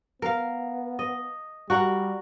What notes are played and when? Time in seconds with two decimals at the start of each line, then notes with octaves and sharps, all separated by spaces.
0.22 B3 A#4 F5
0.99 D#5
1.70 G3 F#4 A#4 F#5